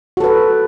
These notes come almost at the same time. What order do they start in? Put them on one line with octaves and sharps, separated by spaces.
F#4 A4 B4